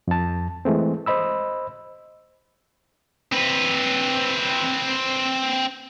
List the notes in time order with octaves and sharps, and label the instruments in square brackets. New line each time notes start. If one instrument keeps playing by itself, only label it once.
[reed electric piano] F2 A5
E3 G#3 A3 C4
C5 D#5 B5 E6
[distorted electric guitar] C4 B4